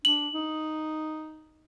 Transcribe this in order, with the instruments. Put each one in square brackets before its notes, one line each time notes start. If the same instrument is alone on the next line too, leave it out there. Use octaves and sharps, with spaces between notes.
[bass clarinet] D4 [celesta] F#7
[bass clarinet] D#4